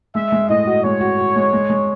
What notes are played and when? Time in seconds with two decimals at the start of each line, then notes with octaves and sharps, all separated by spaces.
0.15 G#3 E5
0.32 G#3
0.49 A2 D#5
0.67 F#4
0.84 G#3 C#5
1.01 F#4
1.18 F#4
1.36 G#3
1.53 G#3
1.70 G#3